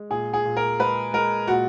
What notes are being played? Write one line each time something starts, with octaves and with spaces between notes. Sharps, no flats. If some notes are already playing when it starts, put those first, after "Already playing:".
Already playing: G#3
A#2 G#4
G#4
A#2
A#4
G#3 B4
G#3 A#4
A#2 F#4